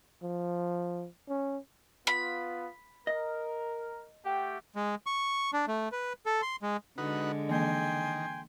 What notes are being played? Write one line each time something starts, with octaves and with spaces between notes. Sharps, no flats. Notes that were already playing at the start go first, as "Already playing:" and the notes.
F3
C#4
B3 F4 B5
A#4 D#5
A3 G4 F#5 G5
G#3
C#6
D4
A3
B4
A4
C6
G#3
D3 G#3 D#4 F#4 B4
D#3 E3 A#3 G5 G#5 C6